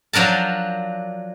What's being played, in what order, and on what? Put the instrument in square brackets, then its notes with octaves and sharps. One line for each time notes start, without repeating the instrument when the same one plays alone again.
[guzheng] F3 F#3 D4 A#4 A5